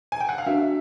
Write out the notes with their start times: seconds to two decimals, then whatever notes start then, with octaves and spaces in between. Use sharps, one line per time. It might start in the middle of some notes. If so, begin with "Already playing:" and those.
0.12 G#5
0.20 G5
0.29 F#5
0.38 F5
0.46 D4 F#4 A#4 E5